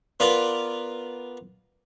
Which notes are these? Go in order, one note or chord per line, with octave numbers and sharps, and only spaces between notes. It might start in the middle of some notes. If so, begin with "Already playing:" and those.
B3 F4 A#4 B4 D5